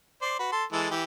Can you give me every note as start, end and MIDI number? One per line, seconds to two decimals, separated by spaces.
0.22 0.37 72
0.22 0.37 74
0.39 0.49 66
0.39 0.49 71
0.52 0.64 69
0.52 0.64 84
0.72 0.90 52
0.72 0.90 56
0.72 0.90 69
0.91 1.04 52
0.91 1.04 67